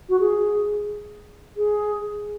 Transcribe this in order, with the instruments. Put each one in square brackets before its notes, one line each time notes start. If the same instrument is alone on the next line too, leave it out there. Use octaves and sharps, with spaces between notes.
[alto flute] F#4
G#4
G#4